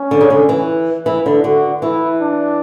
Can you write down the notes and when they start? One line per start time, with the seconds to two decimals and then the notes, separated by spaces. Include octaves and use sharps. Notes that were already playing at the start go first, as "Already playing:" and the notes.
Already playing: C#4
0.11 D3
0.21 C#3
0.30 D3
0.49 E3
1.06 E3 E4
1.26 D3
1.44 D3 F#4
1.82 E3 E4
2.21 D4